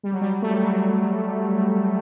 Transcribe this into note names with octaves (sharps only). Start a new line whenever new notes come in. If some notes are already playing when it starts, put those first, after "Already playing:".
G3
F#3
G3
G3
A3
G3
F#3